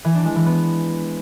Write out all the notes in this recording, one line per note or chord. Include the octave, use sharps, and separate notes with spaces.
E3
D4
G#3
E3
B3